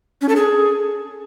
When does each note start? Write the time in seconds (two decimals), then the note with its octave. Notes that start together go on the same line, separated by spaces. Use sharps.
0.21 C#4
0.29 A4
0.36 G#4